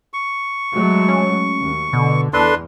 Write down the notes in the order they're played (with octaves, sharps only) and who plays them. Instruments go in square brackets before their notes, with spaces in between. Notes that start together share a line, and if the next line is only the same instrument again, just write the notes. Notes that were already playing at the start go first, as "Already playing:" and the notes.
[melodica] C#6
[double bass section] F#3 G#3 A3
[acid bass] C#4
[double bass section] D#2
[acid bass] B2 [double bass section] D3
[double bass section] E2 [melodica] D4 B4 C6 [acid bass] A4